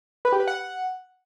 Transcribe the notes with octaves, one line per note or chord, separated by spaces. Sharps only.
B4
G4
B4
F#5